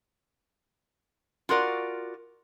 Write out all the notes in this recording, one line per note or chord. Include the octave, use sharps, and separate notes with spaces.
F4 F#4 A#4 D5